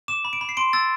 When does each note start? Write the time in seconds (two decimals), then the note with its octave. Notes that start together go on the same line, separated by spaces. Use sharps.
0.08 D6 E7
0.25 B5
0.33 D7
0.41 B5
0.49 C7
0.57 C6 D7
0.73 E6 A6